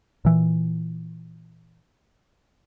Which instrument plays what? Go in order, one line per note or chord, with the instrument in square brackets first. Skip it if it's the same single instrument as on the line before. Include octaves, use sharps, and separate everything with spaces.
[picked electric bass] A#2 E3